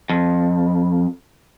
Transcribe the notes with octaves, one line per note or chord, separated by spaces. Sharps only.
F2